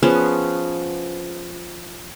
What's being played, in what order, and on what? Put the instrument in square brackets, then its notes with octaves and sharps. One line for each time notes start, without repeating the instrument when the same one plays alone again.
[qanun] F3 B3 C#4 G#4